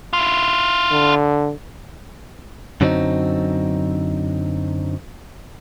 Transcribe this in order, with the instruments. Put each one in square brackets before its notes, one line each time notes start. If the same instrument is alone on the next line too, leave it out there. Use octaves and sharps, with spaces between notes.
[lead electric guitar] E4 F4
[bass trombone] D3
[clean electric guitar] F#2 D3 F#3 C4 C#4 D#4